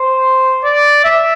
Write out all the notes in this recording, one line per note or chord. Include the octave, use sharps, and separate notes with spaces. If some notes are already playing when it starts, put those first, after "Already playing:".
Already playing: C5
D5
E5